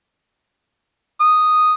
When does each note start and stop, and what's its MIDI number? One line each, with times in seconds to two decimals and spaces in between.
1.20 1.73 87